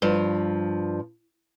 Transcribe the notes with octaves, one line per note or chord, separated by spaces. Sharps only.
G2 F3